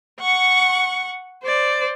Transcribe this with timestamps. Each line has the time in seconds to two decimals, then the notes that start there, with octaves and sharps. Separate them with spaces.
0.20 F#5 C#6
1.43 C5 D5